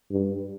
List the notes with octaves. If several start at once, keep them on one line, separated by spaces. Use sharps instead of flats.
G2